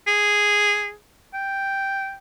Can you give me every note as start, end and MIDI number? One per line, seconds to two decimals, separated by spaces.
0.07 0.94 68
1.34 2.16 79